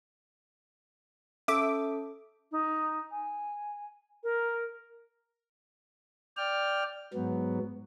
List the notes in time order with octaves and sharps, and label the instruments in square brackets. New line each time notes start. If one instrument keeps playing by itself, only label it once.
[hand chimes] C#4 A4 [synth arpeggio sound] E5 D6
[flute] D#4
G#5
A#4
[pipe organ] D5 G5 F6
G#2 F#3 B3